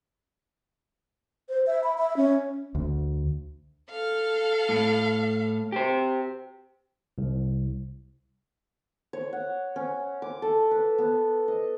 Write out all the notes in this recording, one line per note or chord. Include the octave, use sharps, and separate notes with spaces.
C5
E5
B5
E5
C#4
D2
A4 F5
A2
G4 C5
C2
C#5
F#5
C#4
D6
A4
B4
B3
D#5